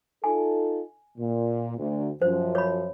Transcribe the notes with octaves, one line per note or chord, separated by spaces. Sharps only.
D#4 F4 A4 G#5
A#2
D2
F#2 F3 C5
C#5 B5